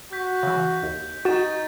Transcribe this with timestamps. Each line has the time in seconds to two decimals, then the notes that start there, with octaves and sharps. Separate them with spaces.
0.13 F#4 G6 B6
0.43 C#3 E3
0.83 D#2
1.25 D#4 F#4 C#6 A6 E7